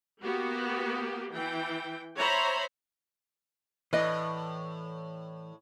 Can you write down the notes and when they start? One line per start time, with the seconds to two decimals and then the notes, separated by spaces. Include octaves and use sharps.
0.22 A#3 B3 F#4 G4
1.34 E3 G5
2.16 C5 C#5 E5 A#5 B5
3.93 A2 E3 B4 D5 D#5